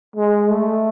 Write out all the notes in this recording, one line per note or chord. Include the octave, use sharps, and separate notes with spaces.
G#3
A3